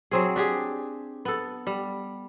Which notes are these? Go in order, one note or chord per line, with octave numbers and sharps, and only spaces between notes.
F#3 C4 G#4
D4 G4 G#4
B3 A4
G3